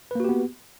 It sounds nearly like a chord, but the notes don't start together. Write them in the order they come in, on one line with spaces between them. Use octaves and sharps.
B4 A#3 F#4 G4 B3